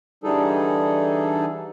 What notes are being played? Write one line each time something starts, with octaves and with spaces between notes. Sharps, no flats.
D3 E3 G3 D#4 G#4 A4